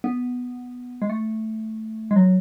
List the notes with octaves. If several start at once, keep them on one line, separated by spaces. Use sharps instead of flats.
B3
G#3
A3
G#3
F#3